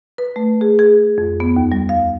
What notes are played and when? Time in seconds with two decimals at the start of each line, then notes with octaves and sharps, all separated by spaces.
0.18 B4
0.36 A3
0.61 G#4
0.79 G#4
1.18 F2
1.40 B3
1.56 D#2
1.72 G3
1.89 F5